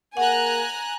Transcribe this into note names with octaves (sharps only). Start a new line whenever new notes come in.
A#3 G#4 A#4 F#5 G#5 A#5 F#6